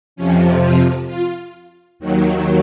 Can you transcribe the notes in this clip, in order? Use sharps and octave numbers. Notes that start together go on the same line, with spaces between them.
F2 C3 F3 C#4
F4
F4
D#2 D#3 F#3